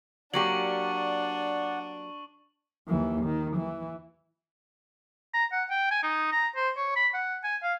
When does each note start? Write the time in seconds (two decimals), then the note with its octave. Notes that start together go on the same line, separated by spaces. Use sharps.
0.34 F#3 A#3 D4 G4 D5 F#5 C#6 F#7
2.88 D#2 E3
3.24 D#3
3.57 E3
5.34 A#5
5.52 F#5
5.70 G5
5.91 G#5
6.03 D#4
6.32 A#5
6.56 C5
6.77 C#5
6.96 B5
7.14 F#5
7.44 G#5
7.63 F5